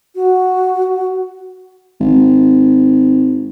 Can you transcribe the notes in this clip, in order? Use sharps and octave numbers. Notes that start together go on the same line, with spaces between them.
F#4
G#1